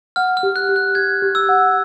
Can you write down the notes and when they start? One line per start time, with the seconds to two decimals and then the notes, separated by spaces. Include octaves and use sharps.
0.16 F#5 F6
0.37 F6
0.43 G4
0.56 F#6
0.69 G4
0.76 F#6
0.95 G4 G#6
1.22 G4
1.35 E6
1.49 F#5